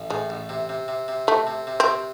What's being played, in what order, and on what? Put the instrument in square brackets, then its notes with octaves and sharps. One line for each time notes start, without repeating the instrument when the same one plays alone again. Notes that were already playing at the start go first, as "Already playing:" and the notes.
Already playing: [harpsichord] A1
[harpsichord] A2 [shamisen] G#3
[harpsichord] A1
C3
C3
C3
C3
[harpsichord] C3 [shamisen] A3
[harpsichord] C3
C3
[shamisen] C4
[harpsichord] C3